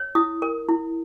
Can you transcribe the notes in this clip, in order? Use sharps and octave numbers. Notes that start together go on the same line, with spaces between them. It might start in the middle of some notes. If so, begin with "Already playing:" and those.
Already playing: C#5
E4 D#6
A#4
E4